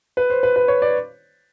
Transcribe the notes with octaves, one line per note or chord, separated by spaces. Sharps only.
B4
C5
B4
B4
C#5
D5